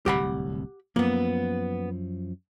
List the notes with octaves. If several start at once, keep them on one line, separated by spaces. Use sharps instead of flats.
D1 C2 G4 F#5 B5
F#2 F3 A#3 B3